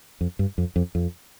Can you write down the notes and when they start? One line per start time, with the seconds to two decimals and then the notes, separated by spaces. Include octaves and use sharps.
0.21 F2
0.39 G2
0.58 F2
0.76 F2
0.95 F2